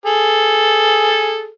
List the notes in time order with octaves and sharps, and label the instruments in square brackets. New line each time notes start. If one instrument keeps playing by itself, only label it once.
[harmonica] G#4 A4